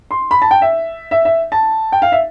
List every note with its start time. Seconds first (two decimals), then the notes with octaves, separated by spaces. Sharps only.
0.11 C6
0.31 B5
0.42 A5
0.51 G5
0.62 E5
1.11 E5
1.25 E5
1.52 A5
1.92 G5
2.02 F5
2.12 E5